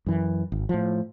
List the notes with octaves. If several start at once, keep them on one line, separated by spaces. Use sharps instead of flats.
F#2 E3
G#1
A2 F3